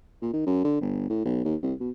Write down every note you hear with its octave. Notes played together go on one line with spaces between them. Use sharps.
A#2
D#3
F#2
D3
G1
A2
B1
D#2
C2
B2